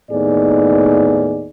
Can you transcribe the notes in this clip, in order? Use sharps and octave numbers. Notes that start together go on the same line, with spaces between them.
D#2 A2 B3 D#4 G#4 D5